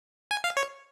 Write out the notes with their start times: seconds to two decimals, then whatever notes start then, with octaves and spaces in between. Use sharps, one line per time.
0.31 G#5
0.44 F5
0.57 C#5